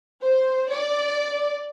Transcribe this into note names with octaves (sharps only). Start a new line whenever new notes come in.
C5
D5